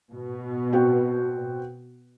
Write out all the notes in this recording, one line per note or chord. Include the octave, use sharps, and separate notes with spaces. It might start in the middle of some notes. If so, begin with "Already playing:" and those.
B2
C4 F#4 G5